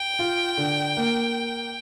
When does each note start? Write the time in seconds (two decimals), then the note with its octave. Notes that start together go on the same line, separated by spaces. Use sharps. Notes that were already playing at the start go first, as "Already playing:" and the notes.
Already playing: G5
0.19 F4
0.57 D3
0.97 A#3